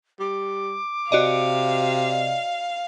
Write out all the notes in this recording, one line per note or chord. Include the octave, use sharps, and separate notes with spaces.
G3 D6
C3 F#4 D5 D#5 F5